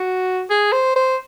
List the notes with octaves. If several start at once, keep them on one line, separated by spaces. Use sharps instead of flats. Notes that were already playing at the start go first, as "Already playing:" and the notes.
Already playing: F#4
G#4
C5
C5